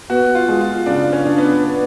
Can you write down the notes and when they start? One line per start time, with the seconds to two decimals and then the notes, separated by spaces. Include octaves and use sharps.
0.10 B3 F#4
0.35 F4
0.48 G#3
0.61 F4
0.86 C#3 D4
1.13 C#4
1.25 D4
1.38 B3
1.64 B3